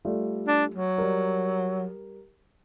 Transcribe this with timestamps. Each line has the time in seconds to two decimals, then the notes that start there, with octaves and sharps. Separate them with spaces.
0.05 G3 A3 F4
0.48 D4
0.74 F#3
0.98 G3 A#4